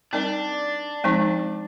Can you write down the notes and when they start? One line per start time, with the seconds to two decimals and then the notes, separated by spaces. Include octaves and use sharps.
0.13 G3 C4 D4 D#4 A#4
1.04 F3 G#3 C4 D#4